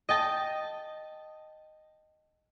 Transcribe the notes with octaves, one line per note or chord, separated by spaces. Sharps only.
D#5 G5 A5